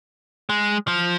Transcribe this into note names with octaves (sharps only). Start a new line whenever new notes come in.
G#3
F3